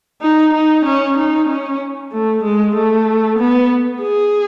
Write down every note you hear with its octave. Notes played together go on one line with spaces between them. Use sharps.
D#4
D#4
C#4
D#4
C#4
A3
G#3
A3
B3
G#4